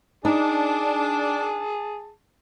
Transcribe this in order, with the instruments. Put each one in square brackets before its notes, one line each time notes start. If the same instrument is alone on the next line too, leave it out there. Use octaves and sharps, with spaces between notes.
[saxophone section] D4 [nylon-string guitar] D#4 [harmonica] G#4 A5